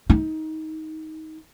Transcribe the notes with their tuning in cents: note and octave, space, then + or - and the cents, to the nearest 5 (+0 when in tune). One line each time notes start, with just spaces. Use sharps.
D#4 +20